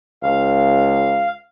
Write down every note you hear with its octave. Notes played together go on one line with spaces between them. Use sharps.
C#2 F5